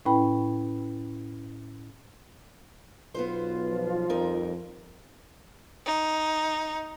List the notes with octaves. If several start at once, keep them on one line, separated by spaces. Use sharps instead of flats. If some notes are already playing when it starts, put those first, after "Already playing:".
A2 C#4 E4 B4 G5 B5
B1 B3 F4 B4 C5
F3
F2 G3 D#4 A#4
D#4